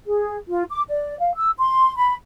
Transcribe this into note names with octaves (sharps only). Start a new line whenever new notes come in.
G#4
F4
D6
D5
F5
E6
C6
B5